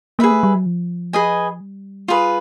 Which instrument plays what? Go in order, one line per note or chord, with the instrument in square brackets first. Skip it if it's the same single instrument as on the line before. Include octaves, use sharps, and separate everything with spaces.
[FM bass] A#3 [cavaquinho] G#4 B4 E5
[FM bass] A3
G3
F#3
F3
[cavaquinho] G#4 B4 D#5 G#5
[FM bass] G3
[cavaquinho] F4 G#4 B4